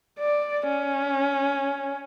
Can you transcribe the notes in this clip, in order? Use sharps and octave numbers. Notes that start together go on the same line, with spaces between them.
D5
C#4